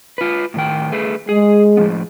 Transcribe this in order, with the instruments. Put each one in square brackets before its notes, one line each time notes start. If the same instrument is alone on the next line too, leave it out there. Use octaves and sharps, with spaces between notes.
[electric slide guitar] F4 B4
A2 D#3 G5
A3 G#4 B4
[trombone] G#3 [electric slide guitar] G#4
[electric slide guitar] A2 F3 B3